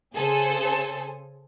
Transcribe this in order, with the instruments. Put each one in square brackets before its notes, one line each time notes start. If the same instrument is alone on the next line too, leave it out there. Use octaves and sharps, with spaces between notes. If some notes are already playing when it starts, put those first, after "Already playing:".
[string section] C#3 G#4 A4 C5 G#5